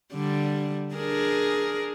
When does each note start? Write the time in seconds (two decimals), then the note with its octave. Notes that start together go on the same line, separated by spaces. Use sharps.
0.13 D3 G3
0.94 D4 G#4 A#4